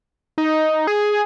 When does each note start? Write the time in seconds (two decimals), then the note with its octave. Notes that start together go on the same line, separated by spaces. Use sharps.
0.38 D#4
0.87 G#4